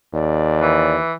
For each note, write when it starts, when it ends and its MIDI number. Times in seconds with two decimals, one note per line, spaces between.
0.14 0.99 39
0.14 0.94 74
0.61 1.13 52